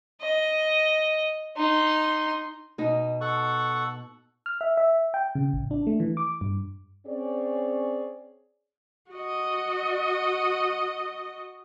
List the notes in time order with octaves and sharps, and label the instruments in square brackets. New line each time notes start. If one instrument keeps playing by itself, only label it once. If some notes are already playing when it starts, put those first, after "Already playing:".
[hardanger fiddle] D#5
D#4 C6
[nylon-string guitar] B2 D#4
[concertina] A4 F#5 C#6
[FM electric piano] F6
E5
E5
G5
C#3
A1
D4
A3
E3
D6
G2
[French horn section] C4 C#4 G#4 C#5 D5
[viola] F#4 D#5